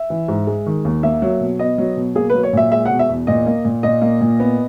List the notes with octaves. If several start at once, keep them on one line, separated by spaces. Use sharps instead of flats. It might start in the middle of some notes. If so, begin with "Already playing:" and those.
Already playing: E5
E3
G#2
G#3
D#3
D#2
A#3 E5
F#3
B2
B3 D#5
F#3
B2
A#3 G#4
F#3 B4
C#5
A#2 E5
G#3 E5
B2 F#5
E5
E2
A#2 D#5
A#3
A#2
A#2 D#5
A#3
A#2
B3